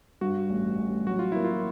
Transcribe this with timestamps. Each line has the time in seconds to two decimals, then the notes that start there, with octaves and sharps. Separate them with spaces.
0.21 G2 F#4
0.50 A1
0.78 A1
1.06 F#3 F#4
1.19 F4
1.32 A#3 E4
1.44 F4